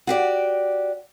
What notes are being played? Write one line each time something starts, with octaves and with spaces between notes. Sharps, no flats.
F#4 G4 D5